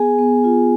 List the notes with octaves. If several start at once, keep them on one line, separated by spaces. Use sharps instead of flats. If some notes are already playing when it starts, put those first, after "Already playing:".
Already playing: B3 G#4 G#5
B3
F4